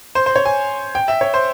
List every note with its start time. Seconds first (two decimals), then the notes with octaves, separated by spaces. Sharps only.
0.15 C5
0.26 C5
0.36 C#5
0.45 G#5
0.95 G5
1.08 E5
1.21 C#5
1.34 C5